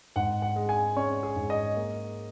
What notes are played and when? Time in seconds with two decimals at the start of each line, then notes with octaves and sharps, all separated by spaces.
0.16 G#2 F#5
0.42 F#5
0.56 G#3
0.69 G#5
0.96 C#4 C#5
1.23 G#4
1.36 G#2
1.50 D#5
1.77 A#3